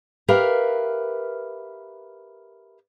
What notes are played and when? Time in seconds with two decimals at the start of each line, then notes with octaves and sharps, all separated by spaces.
0.28 G4 A#4 B4 E5 F5